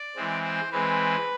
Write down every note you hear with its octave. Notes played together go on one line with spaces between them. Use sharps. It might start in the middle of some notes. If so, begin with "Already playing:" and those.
Already playing: D5
E3 G#3 C4
C5
E3 G#3 C4 B4